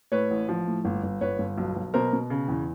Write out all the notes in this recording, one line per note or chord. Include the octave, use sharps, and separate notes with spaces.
A2 B4 C#5
A1
F3
A2
G1
G1
G1 B4 C#5
G1
B1
B1
B2 A#4 C5
B2
C#3
E2